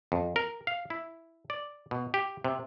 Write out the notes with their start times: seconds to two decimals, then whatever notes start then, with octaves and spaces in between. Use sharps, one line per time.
0.12 F2
0.36 A#4
0.67 F5
0.90 E4
1.50 D5
1.91 B2
2.14 G4
2.44 C3